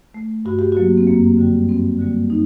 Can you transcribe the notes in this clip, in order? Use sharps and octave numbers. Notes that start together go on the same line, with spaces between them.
A3
G2 F#4
G4
F#3 A#3 F#4
C4
F#2 A#3
D3 G3
G2 C4
D3 G3 A#3
D#4